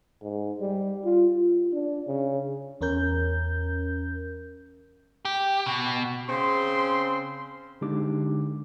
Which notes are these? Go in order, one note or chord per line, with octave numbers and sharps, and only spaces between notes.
G#2
G3
F4
F4
D4
C#3
E2 C#4 A#4 G6
G4
B2
C#3 C4 C6
D3 G#3 D4 D#4 G4 D6